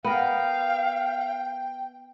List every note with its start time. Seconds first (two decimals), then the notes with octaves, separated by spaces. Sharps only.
0.04 B3 A#4 F5 G5